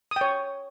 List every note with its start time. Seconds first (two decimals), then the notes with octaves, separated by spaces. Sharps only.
0.11 D#6
0.16 G5
0.21 C#5